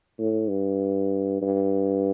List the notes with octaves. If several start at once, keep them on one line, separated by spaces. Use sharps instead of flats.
A2
G2
G2